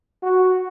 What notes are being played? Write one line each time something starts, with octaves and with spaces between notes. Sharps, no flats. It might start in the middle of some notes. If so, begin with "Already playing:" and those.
F#4